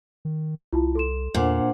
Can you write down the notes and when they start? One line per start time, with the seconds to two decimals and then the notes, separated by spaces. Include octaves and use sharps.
0.25 D#3
0.73 C2 E4 F4 A5
0.95 A4 C6 E7
1.34 E2 A#2 D4 C5 F#5